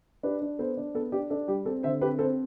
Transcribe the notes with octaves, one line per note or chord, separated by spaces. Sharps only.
D4 G4 B4
D4
B3 A4 C5
D4
B3 A4
D4 G4
D4 A4
G3 G4
C4 A4
D3 C5 E5
C4 G4 B4
C4 A4 C5